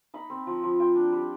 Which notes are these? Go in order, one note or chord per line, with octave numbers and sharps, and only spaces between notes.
D#4 B5
C4
F3
F3
F4 G5
D4
G3